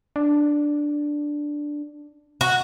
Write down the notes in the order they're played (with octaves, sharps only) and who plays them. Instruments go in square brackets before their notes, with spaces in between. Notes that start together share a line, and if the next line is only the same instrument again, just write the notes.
[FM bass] D4
[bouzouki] F#4